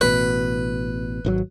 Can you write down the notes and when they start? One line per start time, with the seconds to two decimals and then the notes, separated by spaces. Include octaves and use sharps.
0.01 A1 B2 B4
1.25 G#1 D#3 F#3